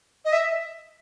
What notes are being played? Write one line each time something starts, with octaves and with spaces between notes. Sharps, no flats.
D#5
E5